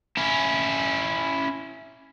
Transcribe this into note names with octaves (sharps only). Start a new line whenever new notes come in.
C#4 E4